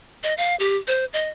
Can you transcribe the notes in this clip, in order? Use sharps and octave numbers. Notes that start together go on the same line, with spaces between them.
D#5
F5
G4
C5
D#5